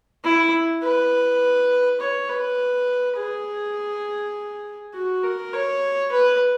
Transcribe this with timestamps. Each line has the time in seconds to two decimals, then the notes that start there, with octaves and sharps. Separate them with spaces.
0.24 E4
0.83 B4
2.01 C#5
2.30 B4
3.18 G#4
4.94 F#4
5.24 A#4
5.53 C#5
6.12 B4